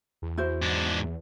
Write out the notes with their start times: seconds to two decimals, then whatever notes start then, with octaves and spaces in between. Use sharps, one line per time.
0.22 E2
0.37 E4 F#4 C5
0.62 G#2 D4